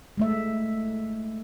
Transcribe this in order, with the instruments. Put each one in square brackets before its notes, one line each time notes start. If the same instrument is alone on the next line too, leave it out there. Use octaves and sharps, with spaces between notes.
[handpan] G#3 A3 E5